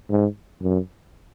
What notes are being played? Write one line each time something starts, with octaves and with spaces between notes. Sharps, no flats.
G#2
F#2